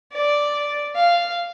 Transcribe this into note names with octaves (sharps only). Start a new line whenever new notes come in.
D5
F5